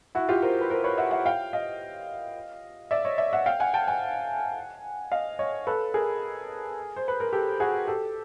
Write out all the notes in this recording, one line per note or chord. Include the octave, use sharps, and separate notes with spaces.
E4 F#4
F4 G4
A#4 C5
B4
A#4 C5
B4 C#5
E5 F#5
E5 F#5
F5 G5
D#5 F5
D5 E5
C#5 D#5
D5 E5
E5 F#5
F5 G5
F#5 G#5
G5 A5
F#5 G#5
D#5 F5
C#5 D#5
A4 B4
G#4 A#4
C5
B4
A#4
G4 A4
F#4 G#4
G4 A4